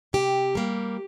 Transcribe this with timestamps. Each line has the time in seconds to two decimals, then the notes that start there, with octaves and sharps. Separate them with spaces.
0.13 C3 G4
0.55 G3 A#3